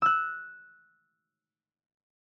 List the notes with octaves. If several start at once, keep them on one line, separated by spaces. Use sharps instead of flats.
E6 F#6